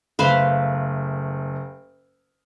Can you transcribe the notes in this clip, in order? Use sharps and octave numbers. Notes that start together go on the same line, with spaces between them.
F#1 A3 B4 C5 F5